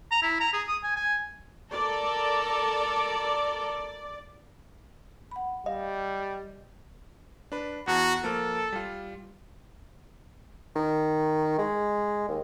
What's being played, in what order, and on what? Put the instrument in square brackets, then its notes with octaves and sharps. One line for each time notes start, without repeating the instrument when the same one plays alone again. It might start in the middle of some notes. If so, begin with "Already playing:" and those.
[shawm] A#5
E4
A#5
G#4
D#6
G#5
G#5
[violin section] A4 A#4 [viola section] D5
[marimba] F#5 B5
[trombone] G3 [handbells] D#5 [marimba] F5
[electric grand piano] D4 B4
[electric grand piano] E2 A5 A#5 [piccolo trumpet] F#4
[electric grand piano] F3 A#3 F6 [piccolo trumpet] A4
[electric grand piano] G3 F4
[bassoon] D#3
G#3
D#2